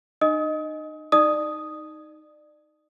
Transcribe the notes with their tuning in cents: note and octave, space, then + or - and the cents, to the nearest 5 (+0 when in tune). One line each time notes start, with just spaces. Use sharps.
D#4 -40 D#5 +0 D#6 +30
D#4 +0 D5 +30 D#6 +0